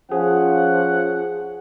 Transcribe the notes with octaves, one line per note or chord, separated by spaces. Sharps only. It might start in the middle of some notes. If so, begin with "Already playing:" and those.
F3 C#4 G#4 F#5